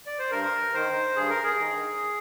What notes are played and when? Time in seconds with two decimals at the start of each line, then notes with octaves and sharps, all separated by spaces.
0.07 D5
0.19 C5
0.31 G2 A#4
0.74 D#3 C5
1.16 G2 G#4
1.30 A#4
1.44 G#4
1.59 D#3